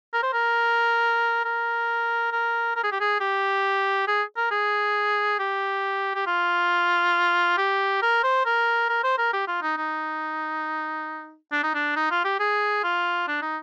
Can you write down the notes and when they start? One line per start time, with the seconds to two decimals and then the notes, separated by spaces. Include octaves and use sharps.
0.13 A#4
0.23 C5
0.33 A#4
1.45 A#4
2.32 A#4
2.76 A#4
2.83 G#4
2.92 G4
3.00 G#4
3.20 G4
4.07 G#4
4.37 A#4
4.51 G#4
5.39 G4
6.15 G4
6.26 F4
7.58 G4
8.02 A#4
8.23 C5
8.46 A#4
8.89 A#4
9.04 C5
9.18 A#4
9.33 G4
9.47 F4
9.62 D#4
9.77 D#4
11.52 D4
11.63 D#4
11.74 D4
11.96 D#4
12.11 F4
12.25 G4
12.40 G#4
12.84 F4
13.28 D4
13.42 D#4